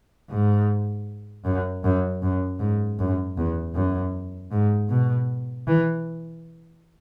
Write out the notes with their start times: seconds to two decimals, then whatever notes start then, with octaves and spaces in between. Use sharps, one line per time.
0.30 G#2
1.45 F#2
1.84 F#2
2.23 F#2
2.60 G#2
2.99 F#2
3.37 E2
3.75 F#2
4.52 G#2
4.90 B2
5.68 E3